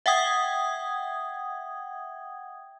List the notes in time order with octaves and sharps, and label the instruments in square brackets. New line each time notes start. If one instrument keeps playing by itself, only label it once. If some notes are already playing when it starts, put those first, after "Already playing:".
[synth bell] E5 F#5 G5 D#6 G#6